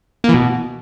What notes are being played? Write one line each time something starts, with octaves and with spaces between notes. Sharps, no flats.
A#3
E3
B2